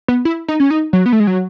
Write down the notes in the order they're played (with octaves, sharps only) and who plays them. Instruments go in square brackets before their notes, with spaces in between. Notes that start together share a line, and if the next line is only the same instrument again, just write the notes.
[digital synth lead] B3
E4
D#4
C#4
D#4
F#3
B3
A3
G#3
F#3